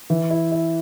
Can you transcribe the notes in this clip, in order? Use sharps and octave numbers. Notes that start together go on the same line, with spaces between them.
E3
E4
E4